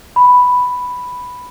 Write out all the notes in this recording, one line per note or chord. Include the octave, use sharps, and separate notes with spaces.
B5